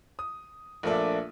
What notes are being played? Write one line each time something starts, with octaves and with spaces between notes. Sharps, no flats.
D#6
A#1 A3 A#3 D4 E5